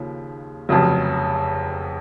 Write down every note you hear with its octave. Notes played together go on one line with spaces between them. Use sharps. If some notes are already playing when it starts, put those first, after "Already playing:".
Already playing: D#2 C#3 F3
F1 F2 C#3 F#3